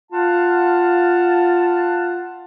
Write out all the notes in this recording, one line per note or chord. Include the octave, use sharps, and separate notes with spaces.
F4 F5 F#5 A5